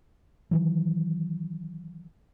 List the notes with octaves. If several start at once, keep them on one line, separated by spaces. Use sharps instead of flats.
D#3 E3 F#3